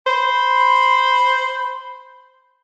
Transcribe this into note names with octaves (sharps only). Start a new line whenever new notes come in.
C5 B5